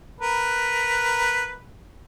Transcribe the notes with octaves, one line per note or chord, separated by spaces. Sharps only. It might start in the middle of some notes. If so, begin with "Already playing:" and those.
A#4 B4